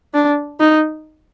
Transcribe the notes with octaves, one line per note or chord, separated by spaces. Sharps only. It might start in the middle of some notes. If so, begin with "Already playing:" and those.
D4
D#4